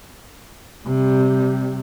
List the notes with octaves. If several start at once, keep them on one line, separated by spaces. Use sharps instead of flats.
C3 G3